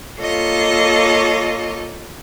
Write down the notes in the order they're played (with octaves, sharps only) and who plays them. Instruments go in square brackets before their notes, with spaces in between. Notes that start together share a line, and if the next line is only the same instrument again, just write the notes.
[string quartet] A#3 F4 A4 C#5 D#5